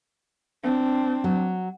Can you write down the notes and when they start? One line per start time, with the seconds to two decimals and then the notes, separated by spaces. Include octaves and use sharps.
0.63 C4 D4
1.24 F#3